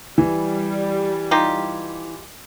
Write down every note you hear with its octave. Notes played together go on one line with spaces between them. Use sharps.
E3 G3
D#4 F4 G4